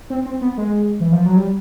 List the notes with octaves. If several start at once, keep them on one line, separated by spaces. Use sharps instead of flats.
C4
C4
B3
G#3
E3
F3
F#3
G3